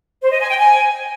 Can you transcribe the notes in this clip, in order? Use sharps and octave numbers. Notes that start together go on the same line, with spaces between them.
C5
D#5
G#5
G5
G#5